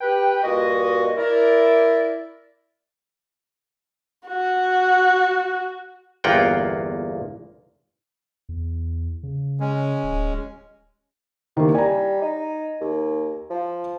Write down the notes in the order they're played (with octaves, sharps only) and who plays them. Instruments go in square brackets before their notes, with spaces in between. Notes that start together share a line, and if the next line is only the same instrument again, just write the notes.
[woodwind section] G4 B4 G5
G2 A#2 F#4 D#5
E4 A#4 D5
[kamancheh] F#4
[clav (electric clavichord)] G1 E2 A#3 F4 F#5 G5
[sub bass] E2
C#3
[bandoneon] G#3 C#4
[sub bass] D1
[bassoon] C3 [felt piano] D#3 A#3
[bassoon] G3 [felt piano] G#5 A#5
[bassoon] D#4
D#2
F3